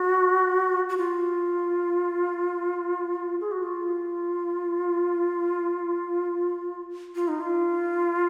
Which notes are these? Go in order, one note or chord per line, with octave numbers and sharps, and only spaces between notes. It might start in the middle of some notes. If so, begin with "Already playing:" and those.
Already playing: F#4
F#4
F4
G#4
F#4
F4
F4
D#4
F4